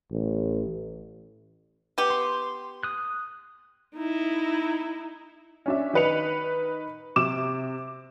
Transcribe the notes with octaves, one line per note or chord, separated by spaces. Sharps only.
A1
B3 G4
C6
D#6 F#6
D#4 E4
C#4 D4 E5
D#3 D#4 B4 C#7 F7
C3 D6 E7